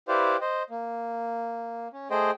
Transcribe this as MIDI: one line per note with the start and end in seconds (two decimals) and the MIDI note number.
0.08 0.37 64
0.08 0.37 67
0.08 0.37 71
0.08 0.37 72
0.08 0.37 74
0.08 0.37 77
0.41 0.63 72
0.41 0.63 75
0.70 1.88 58
1.93 2.08 61
2.10 2.31 57
2.10 2.31 68
2.10 2.31 72
2.10 2.31 75
2.10 2.31 79